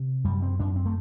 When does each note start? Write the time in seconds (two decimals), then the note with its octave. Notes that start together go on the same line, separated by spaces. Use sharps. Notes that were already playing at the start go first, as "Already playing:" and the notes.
Already playing: C3
0.24 F#2 G3
0.42 C4
0.59 F#2 D4
0.76 C4
0.86 A3